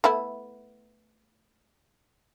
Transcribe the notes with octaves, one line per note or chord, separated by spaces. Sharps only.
A3 B3 E4